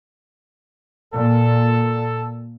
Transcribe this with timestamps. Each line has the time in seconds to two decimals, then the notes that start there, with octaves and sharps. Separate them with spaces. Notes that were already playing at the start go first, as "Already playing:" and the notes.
1.13 A#2 A4